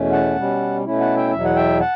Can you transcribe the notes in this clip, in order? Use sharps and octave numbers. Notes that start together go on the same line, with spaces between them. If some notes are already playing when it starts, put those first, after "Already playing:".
Already playing: E2 B2 A3 C#4
F#5 A5
B2 G3 C#4
B2 A3 C#4 E4
F#5 A5
E5 G5
E2 B2 F#3 E5
F#5
E5 G5
F#5 A5